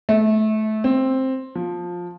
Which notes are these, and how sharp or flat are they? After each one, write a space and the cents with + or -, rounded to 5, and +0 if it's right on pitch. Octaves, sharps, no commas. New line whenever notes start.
A3 -25
C4 +10
F3 +10